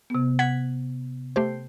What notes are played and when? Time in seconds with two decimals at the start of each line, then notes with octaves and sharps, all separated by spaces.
0.10 C3 B3
0.39 F#5 G#6 B6
1.36 A3 G4 C5